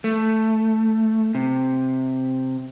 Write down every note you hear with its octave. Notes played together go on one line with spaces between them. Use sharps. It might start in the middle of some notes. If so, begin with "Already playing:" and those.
A3
C3